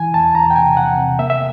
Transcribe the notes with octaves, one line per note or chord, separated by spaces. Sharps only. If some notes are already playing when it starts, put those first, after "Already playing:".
Already playing: E3 G#5
E2 A5
E2 A#5
G5
C3 G#5
C3 F#5
C3
A#3 E5
E5